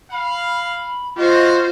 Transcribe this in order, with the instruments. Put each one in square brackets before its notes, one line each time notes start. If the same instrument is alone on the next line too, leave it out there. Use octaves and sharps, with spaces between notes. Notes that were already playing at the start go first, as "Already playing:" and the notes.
[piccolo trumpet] F5 [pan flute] B5
[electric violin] F4 C5 [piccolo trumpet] F#4 [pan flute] D#5